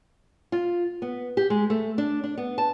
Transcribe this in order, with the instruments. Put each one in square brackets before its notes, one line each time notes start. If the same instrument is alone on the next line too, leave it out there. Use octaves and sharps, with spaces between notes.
[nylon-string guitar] F4
B3
G4
G#3
A3
D4
D4
B3
A5